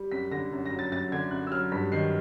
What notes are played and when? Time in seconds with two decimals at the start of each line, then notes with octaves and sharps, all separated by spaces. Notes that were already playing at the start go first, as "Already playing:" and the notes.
Already playing: G3
0.11 F#2 B6
0.31 D3 A#6
0.52 F#2
0.66 A#6
0.71 F#3
0.79 A6
0.92 F#2 A6
1.12 D3 G#6
1.31 F#2 F#6
1.47 E6
1.51 F#3 F6
1.72 G2 B6
1.92 D#3 C7